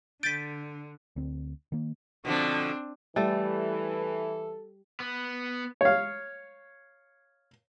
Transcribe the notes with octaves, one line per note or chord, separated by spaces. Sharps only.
D3 G6 A6 B6 D7 D#7
D2 C4
D#3 A#3
B2 D3 F3 C4 D4
E3 G3 A3 A4
B3
C#5 F5